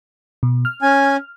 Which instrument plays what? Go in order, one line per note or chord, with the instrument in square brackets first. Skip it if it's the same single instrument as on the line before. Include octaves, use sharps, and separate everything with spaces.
[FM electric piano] B2
F6
[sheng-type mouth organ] C#4 G#5